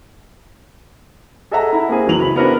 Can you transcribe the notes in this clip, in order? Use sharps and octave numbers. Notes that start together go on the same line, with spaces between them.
G#4 A4 D#5 E5 F#5 A#5
E4
A#3 C4 G#4
C#2 E3 F#3 F7 F#7
B5
B3 C4 D4 E4 F#4 A#4